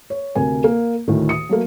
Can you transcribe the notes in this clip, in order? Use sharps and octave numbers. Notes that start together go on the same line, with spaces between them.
C#5
D2 C3 A#4 G#5
A#3
D2 A2 D#3
D#6 C#7
F#3 A3 A#3